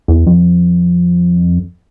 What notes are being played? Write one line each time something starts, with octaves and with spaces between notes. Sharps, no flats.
E2
F2